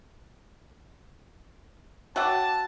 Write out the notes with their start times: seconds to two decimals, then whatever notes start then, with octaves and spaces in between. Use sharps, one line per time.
2.16 F#4 C#5 E5 F#5 G5 A5 D6